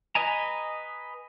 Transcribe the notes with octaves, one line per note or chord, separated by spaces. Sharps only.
B4 D#5 G#5 A#5